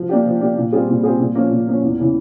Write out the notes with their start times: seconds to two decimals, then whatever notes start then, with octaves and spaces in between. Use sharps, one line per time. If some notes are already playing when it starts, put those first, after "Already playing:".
Already playing: F3
0.09 A#3 D4 G4
0.25 F3
0.41 A#3 D4 G4
0.57 A#2
0.72 G3 C4 F4 G#4
0.88 A#2
1.03 G3 C4 F4 G#4
1.19 A#2
1.35 F3 A#3 C#4
1.51 A#2
1.67 F3 A#3 C#4
1.83 E2
1.99 C#3 E3